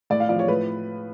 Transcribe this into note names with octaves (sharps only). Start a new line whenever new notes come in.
A2 D5
F5
F3 D5
C#5
A2 B4